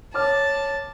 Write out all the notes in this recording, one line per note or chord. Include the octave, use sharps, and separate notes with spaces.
C#5 A5 D6 F6